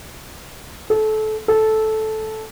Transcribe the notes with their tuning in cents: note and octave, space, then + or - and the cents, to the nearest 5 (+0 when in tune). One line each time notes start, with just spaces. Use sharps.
A4 -25
A4 -10